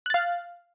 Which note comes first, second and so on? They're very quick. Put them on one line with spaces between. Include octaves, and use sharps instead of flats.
F#6 A6 F5